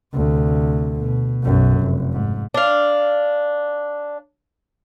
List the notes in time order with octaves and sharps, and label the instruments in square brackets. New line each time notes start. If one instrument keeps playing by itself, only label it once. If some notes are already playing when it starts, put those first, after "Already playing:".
[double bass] D2 C3
B2
B1 F#2
F1
G#2
[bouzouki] D4 F5